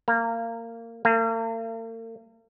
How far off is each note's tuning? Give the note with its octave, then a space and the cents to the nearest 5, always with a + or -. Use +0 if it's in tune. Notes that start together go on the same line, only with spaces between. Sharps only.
A#3 -20
A#3 -45